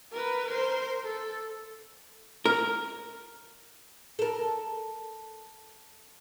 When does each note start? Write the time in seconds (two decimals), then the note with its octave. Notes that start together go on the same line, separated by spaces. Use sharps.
0.12 A#4 B4
0.46 A#4 C5
1.04 A4
2.45 A#4
4.19 A4 A#4